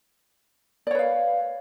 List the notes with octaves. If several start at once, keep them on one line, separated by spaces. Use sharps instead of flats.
B4 C#5 D5 F5